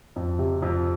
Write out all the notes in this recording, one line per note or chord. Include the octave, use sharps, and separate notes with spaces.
F2
C3
F2